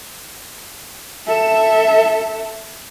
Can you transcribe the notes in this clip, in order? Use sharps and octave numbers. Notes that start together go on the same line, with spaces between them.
A4 E5